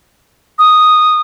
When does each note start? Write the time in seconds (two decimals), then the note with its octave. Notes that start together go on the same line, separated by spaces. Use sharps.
0.59 D#6